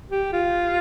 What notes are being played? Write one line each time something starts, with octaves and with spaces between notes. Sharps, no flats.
G4
F4